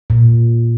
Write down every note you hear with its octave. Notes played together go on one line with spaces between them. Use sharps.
A#2